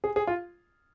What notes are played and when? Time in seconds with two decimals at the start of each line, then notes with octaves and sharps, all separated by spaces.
0.04 G#4
0.16 G#4
0.27 F4